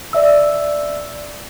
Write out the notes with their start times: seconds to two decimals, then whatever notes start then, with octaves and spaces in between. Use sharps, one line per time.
0.13 D5 E5 E6